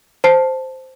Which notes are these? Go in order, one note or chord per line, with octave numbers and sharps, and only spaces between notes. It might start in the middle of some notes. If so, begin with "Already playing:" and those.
C5 A5 C7